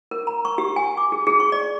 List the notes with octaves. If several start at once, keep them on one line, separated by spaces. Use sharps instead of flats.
A#4
A#5
C#6
G4
G#5
D6
G#4
G#4
C#6
D5